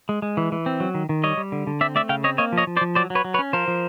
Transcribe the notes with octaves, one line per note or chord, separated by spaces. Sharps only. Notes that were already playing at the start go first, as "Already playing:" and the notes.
G#3
G#3
E3
E3
C4
F#3
D#3
D#3
G3 C#5 D#5
G3
D3
D3
C4 D5 E5
A3 D5 E5
C#3 F5 G5
C4 C#5 D#5
A#3 C#5 D#5
F3
C#5 D#5
F3
C5 D5
F3
F#3 C5 D5
F#3
B4 C#5
F#3
B4 C#5
C#4
F3 A#4 C5
F3